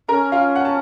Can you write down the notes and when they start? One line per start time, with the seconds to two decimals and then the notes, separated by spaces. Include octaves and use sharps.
0.08 C#4 A#4 A#5
0.32 F4 F5
0.56 F#5
0.65 A5